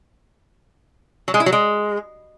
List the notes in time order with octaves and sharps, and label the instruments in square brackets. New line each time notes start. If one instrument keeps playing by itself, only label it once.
[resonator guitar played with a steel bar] F#3
G#3
E4
F#3
G#3